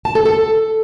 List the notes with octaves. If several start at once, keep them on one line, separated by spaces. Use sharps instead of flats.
A5
A4
A4